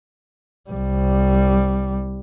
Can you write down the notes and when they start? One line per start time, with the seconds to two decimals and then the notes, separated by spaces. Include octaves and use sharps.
0.70 C2 G3